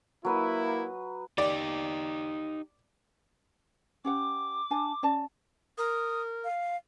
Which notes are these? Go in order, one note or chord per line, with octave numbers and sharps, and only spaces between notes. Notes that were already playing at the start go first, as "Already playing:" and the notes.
F#3 A#3 E4 B4 D#6
D#4 G4 D5
C#4 G4 F#5 D6
D4 G#5 A5
C#4 D5 A5
A#4 D#6
F5